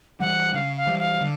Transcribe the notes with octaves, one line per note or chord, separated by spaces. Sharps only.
E3 G3 F#5
C#3 F5
F5
E3 G3
F5
D3